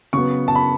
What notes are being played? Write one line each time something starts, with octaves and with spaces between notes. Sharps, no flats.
C#3 F#3 B3 C#6
A5
B5